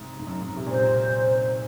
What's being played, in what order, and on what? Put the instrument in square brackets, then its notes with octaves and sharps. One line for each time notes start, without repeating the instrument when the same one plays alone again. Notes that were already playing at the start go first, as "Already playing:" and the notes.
Already playing: [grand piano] G#2 C3
G#2
F#2
G#2
C3
A#2
[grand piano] C3 [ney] C5